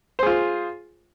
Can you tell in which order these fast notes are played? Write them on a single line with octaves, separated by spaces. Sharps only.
C5 G#4 F4